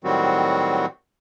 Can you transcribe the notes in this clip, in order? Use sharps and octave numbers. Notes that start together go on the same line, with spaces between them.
A2 D#3 F#3 G3 C4 F#4